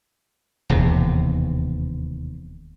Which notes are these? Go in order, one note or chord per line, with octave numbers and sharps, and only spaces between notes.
E1 D#2 C3